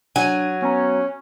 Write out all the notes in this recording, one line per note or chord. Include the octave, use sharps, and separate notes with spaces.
F#3 D4 G#5
B3 C#4 A#5